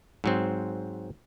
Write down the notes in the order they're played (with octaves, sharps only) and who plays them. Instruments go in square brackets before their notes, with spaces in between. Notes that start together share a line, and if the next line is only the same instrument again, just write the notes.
[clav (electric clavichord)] G#2 F#3 C4